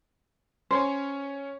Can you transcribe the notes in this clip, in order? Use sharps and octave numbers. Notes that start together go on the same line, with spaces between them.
C#4 C5 C#5 G#5